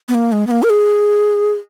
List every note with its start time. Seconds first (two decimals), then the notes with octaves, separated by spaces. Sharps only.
0.08 B3
0.14 A#3
0.32 G#3
0.47 B3
0.51 A#3
0.63 A#4
0.70 G#4